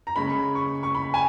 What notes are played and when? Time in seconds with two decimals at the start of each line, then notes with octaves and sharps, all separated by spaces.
0.07 A#5
0.16 C#3 G#3 C#4 B5
0.55 C#6
0.83 C#6
0.95 B5
1.14 G#5